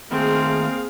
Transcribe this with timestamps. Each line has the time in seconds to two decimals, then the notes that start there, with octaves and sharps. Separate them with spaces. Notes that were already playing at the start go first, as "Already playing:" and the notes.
0.11 D#3 A3 A#3 C4 F4 G#4 F5